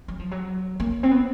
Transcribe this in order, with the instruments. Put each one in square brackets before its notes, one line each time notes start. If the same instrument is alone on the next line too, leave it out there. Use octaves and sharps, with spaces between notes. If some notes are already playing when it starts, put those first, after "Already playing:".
[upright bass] F#3
F3
F#3
A#3
C4
B3